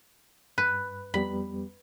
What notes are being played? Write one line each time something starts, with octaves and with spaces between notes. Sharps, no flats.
G2 B4
F2 G3 B3 B5